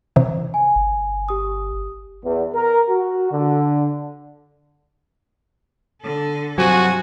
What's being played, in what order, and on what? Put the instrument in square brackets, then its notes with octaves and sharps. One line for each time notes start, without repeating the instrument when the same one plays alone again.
[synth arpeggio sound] C3 E3
[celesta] G#5
[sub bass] G1
[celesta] G4 D#6
[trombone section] E2
A#4
F#4
D3
[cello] D3 A4
[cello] G2 [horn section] C3 F3 G#5 [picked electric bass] F#3 [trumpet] F#4